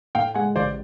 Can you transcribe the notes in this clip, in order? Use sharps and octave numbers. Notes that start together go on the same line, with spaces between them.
A2 F5 G5
G#3 F#5 G#5
A1 C5 D5